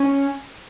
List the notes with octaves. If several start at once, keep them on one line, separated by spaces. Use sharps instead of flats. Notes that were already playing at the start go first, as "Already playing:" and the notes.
Already playing: C#4